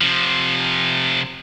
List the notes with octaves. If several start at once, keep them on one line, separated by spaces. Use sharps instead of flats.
C3 F3